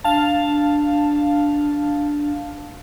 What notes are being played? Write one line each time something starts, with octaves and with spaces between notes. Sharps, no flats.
D4 F5 A5